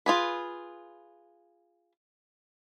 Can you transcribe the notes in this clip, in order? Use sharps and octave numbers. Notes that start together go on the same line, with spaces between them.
F4 G#4 B4